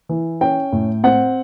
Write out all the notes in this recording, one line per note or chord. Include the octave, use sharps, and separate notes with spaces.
E3
C#4 G5
A2
C4 F#5